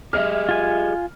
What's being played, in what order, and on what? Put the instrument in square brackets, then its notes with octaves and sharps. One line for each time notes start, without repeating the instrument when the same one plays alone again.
[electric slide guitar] G4 G#4 D#5 [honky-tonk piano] E5 F6
[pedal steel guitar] F4 G#5